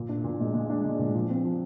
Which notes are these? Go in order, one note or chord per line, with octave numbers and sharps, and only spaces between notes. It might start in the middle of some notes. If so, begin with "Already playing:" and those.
Already playing: A#2
D4
A#2
G#3
G#3
D4
G#3
A#2
F3
C4
F3